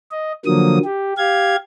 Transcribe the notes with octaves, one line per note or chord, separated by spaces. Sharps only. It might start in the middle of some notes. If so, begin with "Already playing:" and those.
D#5
D3 F3 F#3 A#3 D#6
G4
G4 F5 G#6